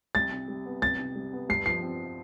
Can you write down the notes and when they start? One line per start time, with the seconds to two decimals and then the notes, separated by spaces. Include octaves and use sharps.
0.15 C2 A6
0.32 C3
0.48 G3
0.65 B3
0.82 C2 A6
0.99 C3
1.15 G3
1.33 B3
1.49 G2 C7
1.66 F3 C7
1.82 C4